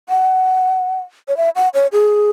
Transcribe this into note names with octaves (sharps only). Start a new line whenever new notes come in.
F#5
C#5
E5
F#5
C#5
G#4